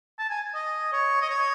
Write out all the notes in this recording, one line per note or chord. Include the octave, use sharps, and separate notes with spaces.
A5
G#5
D#5
C#5
D#5
C#5